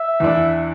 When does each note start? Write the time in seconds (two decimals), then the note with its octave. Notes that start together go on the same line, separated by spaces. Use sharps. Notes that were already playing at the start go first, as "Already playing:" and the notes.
Already playing: E5
0.20 E2 E3 D4